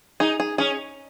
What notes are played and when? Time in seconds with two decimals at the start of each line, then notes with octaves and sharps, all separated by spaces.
0.20 D#4 G#4
0.40 G#4
0.58 C#4 G#4